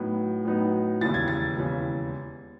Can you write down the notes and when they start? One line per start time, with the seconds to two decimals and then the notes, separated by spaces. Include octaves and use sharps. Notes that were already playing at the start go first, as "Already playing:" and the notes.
Already playing: A2 F#3 B3 D#4
0.45 A2 F#3 B3 D#4
1.01 E1 D#2 C#3 E3 A6
1.14 G#6
1.28 A6
1.56 E1 D#2 C#3 E3